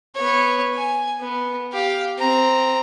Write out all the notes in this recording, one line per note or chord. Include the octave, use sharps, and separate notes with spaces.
B3 C#5
G#5
B3
G4 F5
C4 A#5